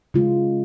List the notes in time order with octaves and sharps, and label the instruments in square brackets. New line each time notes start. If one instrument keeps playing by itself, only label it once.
[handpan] C#3 G#3 F4